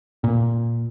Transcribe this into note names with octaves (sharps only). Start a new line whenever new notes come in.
A#2